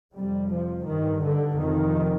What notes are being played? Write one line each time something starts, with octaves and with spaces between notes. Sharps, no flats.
F2 C3 G3
F3
G2 D#3
D3
F2 C3 D#3